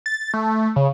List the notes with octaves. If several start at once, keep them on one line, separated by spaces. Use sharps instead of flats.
A6
A3
C#3